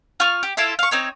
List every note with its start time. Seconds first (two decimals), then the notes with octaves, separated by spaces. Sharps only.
0.20 F4 C#6 F6
0.43 G4
0.57 E4 F4 A4 E5
0.79 F5 C#6
0.91 C4 D#4 C#5